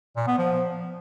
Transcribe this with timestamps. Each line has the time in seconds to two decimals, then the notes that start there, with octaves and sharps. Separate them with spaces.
0.16 A#2
0.27 B3
0.38 F3